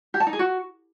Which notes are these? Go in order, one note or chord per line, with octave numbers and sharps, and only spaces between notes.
G4
A5
D#4
G#4
F#4